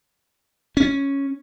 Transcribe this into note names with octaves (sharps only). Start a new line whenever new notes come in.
C#4